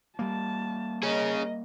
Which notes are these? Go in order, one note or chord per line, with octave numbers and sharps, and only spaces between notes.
G3 A#3 A5
G#4 A#4 C#5 D#5